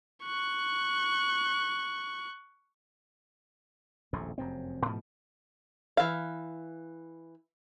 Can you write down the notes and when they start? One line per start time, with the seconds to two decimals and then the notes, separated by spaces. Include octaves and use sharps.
0.24 C#6 F#6
4.13 D#1 A#1 F2 A2
4.38 F1 F#2 C4
4.86 G#2 B2 E3 F3
5.97 E3 F5